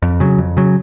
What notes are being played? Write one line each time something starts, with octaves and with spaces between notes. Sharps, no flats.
F2
C#3 F#3
F2
C#3 F#3